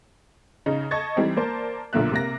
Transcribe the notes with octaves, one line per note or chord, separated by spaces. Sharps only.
C#3 D#4
D#5 A5 C#6 G#6 A6
E3 G3 C4 D#4
A#3 A#4 C5 D5 A5
B1 A#2 D3 A#3 E5 F#6
C3 A#3 A#6